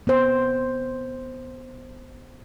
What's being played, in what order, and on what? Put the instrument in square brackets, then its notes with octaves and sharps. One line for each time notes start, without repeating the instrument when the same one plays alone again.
[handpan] B3 C5